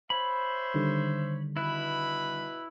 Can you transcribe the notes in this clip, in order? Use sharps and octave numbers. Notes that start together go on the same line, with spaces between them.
C5 C#5 E5 B5
D3 D#3 G3
B2 E4 B4 B5